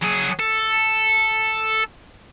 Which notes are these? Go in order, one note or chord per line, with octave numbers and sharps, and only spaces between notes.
F#3 G#4
A4